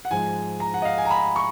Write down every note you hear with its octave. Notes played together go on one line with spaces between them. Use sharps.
F#5
G#2 F3 G#3 G#5
A#5
F#5
D#5
F5
G#5
A#5
B5
C#6